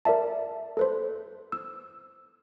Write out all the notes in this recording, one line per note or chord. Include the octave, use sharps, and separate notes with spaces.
A#4 D5 E5 A5
A4 B4 C5
E6